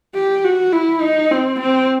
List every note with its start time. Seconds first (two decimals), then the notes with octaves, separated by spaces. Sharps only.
0.15 G4
0.44 F#4
0.73 E4
1.02 D#4
1.31 C4
1.60 C4